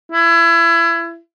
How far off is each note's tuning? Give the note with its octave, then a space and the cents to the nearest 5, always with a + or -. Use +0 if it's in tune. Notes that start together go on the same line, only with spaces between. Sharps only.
E4 +30